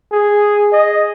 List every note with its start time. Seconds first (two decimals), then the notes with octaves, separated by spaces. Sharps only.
0.12 G#4
0.73 D#5